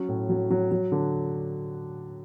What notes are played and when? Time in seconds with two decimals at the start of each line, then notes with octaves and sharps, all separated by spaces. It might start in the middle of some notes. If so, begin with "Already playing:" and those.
Already playing: F#3 C#4
0.09 A2
0.29 F#3
0.50 F#3
0.72 F#3
0.92 D3